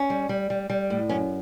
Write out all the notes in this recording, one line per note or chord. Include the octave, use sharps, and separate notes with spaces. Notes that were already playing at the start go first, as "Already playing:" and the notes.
Already playing: C#4
G3
G3
G3
G3
A2
F#2 C#4